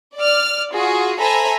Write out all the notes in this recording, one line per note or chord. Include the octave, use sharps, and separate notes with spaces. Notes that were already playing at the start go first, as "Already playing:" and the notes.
D5 F6
F4 F#4 G#4
A4 C5 E5 G#5 A#5 B5